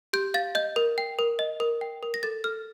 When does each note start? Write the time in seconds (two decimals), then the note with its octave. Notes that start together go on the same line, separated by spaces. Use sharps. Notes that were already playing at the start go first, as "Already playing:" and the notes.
0.13 G4 G6
0.34 F5 A6
0.55 D#5 G6
0.76 A#4
0.98 G5
1.19 A#4
1.39 D#5
1.60 A#4
1.81 G5
2.03 A#4
2.14 A#6
2.23 A4 A6
2.44 A4 F6